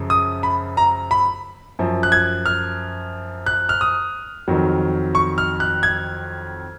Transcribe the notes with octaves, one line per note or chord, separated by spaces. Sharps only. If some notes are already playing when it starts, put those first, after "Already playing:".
Already playing: F#2 C#3 F3
D#6
B5
A#5
B5
F#2 F3
F#6
G#6
F6
F#6
F6
D#6
F2 D#3 F#3
C#6
F6
F#6
G#6